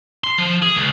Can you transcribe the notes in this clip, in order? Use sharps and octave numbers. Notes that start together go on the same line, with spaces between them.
C6
F3
G#4
C#2